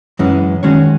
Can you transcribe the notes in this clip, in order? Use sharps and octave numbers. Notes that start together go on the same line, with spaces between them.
F#2 E3 G#3 C#4
D#3 G#3 C#4 F#4 C#5